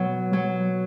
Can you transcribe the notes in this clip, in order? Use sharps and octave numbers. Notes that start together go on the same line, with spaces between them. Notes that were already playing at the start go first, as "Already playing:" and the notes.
Already playing: B2 F#3
F#3